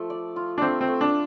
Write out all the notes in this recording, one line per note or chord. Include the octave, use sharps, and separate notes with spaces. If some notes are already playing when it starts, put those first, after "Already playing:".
Already playing: F3 A3
D5
F4
D4
A3 C4
C4
A3
D4